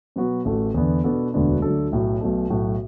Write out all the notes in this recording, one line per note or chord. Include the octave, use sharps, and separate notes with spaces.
B2 F#3 B3 F#4
A1 A2 A3 F#4 A4
E2 D3 B3
B2 B3 D4 F#4 A4
E1 D2 D3 B3 F#4
D2 D3 F#3 D4 A4
B1 A2 F#3
B1 B2 A3
B1 A2 F#3 A3 F#4